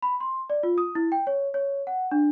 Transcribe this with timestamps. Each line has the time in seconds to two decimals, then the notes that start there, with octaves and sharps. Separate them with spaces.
0.02 B5
0.20 C6
0.50 D5
0.63 F4
0.78 D#6
0.95 E4
1.12 G5
1.27 C#5
1.54 C#5
1.87 F#5
2.12 D4